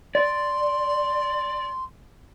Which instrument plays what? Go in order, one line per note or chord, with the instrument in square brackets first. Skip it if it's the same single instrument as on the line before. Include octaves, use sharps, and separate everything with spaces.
[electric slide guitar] D5 [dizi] C6